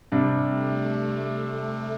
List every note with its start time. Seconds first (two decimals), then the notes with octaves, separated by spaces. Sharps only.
0.12 C3 G3 D4
0.45 A3